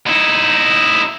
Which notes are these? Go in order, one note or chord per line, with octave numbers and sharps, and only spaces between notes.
D#4 E4